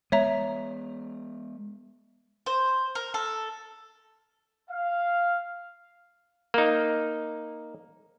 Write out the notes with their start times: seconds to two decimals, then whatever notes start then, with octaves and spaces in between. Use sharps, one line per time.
0.12 G#3 B3 C#5 E5 A#5
2.46 C5
2.95 A#4
3.14 A4
4.70 F5
6.54 A#3 D#4